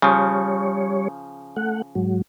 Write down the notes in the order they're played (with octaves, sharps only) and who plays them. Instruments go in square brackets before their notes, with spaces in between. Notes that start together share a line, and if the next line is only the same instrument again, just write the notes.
[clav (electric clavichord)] C#3 F3 [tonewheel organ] G3 C#5
[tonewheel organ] A3 F#5
G#2 F#3